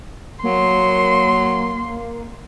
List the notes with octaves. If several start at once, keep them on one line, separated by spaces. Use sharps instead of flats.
F#3 A#3 C6